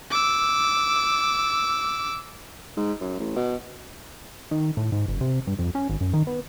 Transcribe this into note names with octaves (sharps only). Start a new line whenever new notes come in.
D6 E6
G#2
F#2
A1
B2
D#3
A2
G#2
F#1
C3
G2
F2
C#4
G#1
F#2
D#3
B3